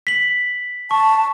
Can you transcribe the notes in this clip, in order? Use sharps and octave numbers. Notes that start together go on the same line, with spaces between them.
B6 F#7
A5 C#6